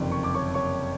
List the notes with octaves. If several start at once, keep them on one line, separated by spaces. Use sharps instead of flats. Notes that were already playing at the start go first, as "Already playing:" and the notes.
Already playing: F#1 F2 C3 D#3 D5
C#6
D6
C#5 C#6
C#5 C#6